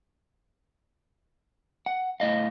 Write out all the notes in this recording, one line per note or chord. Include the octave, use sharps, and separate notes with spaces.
F#5
A2 D#5 F5